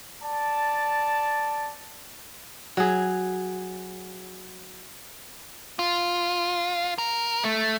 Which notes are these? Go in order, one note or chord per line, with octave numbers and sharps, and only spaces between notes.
D5 A5
F#3 G#4
F4
A#4
A3